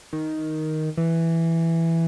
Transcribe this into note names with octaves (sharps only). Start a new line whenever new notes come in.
D#3
E3